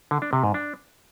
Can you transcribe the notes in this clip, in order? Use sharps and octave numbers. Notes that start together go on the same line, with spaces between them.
D3
D4
C3
G#2
D4